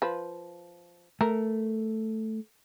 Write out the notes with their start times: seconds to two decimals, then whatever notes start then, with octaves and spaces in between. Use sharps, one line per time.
0.02 F3 B4
1.21 A3 A#4